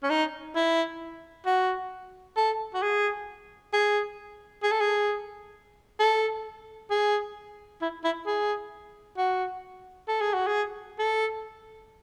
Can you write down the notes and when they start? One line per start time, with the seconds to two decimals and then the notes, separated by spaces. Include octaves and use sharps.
0.03 C#4
0.10 D#4
0.55 E4
1.46 F#4
2.37 A4
2.74 F#4
2.83 G#4
3.73 G#4
4.63 G#4
4.72 A4
4.80 G#4
6.00 A4
6.91 G#4
7.81 E4
8.04 E4
8.26 G#4
9.17 F#4
10.08 A4
10.21 G#4
10.34 F#4
10.47 G#4
10.99 A4